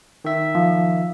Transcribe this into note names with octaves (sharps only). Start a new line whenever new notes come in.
D#3 E5
F3